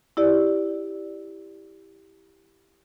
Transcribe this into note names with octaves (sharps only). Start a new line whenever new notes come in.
E4 G4 D5